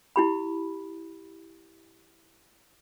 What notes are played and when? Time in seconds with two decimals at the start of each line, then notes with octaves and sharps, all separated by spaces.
0.16 E4 G4 B5